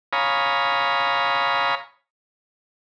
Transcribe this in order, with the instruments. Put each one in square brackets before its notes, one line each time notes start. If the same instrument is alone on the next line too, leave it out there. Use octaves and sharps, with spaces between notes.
[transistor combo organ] C#5 F5 G#5 A#5 B5 D#6